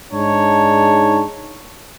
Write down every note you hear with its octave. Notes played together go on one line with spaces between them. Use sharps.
G#2 D4 D#4 G#4 C#5 A5